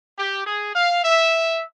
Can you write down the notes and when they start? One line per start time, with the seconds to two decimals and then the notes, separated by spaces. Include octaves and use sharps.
0.19 G4
0.46 G#4
0.74 F5
1.04 E5